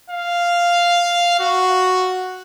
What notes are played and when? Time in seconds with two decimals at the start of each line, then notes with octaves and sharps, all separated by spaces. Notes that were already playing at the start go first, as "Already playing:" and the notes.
0.10 F5
1.40 F#4